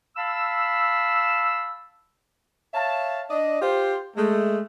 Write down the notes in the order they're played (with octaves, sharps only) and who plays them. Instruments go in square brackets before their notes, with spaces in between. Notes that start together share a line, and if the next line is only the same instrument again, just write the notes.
[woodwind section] F5 A5 B5 E6
[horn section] C#5 E5 F5 A5
D4 D5 D#5
F4 G4 C5
G#3 A3